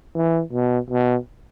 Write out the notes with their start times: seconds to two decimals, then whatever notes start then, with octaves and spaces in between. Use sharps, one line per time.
0.15 E3
0.53 B2
0.90 B2